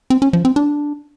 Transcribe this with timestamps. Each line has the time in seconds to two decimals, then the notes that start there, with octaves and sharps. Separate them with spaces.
0.10 C4
0.22 C#4
0.33 F3
0.45 C4
0.56 D4